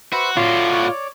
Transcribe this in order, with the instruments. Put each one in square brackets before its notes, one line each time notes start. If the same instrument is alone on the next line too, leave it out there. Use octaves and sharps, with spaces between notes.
[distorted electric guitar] F#4 [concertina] B4 C5 E5
[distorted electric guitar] A2 F#4 [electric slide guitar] F4 [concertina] C#5 D5 D6